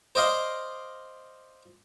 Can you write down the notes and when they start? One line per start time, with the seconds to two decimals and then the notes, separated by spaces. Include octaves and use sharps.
0.15 C5 D5 D#5 F5 C6